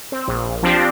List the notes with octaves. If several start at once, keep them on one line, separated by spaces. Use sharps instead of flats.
C4
A#1
F3 C4 D4 G4